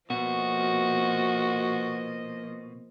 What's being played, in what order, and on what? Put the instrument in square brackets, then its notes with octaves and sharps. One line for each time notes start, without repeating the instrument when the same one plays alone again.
[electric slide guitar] B2 [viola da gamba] F3 A#3 D#5 [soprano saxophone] F#4